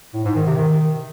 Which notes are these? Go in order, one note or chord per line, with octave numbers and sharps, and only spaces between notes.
A2
G#2
D#3
C3
D#3